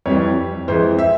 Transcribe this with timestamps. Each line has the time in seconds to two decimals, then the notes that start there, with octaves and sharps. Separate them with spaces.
0.06 F2 E3 G3 C#5
0.68 F2 E3 G#3 C5
0.99 E5